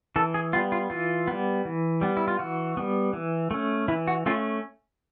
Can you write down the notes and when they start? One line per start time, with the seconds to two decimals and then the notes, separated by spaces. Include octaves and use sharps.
0.16 E3 A4
0.34 G#4
0.53 G3 B3 F4
0.72 F4
0.90 E3 F4
1.28 G3 B3
1.65 E3
2.01 G3 B3
2.17 E4
2.28 F4
2.39 E3 F#4
2.77 G3 B3
3.13 E3
3.51 A3 C#4
3.88 E3 E4
4.08 F#4
4.26 A3 C#4 F4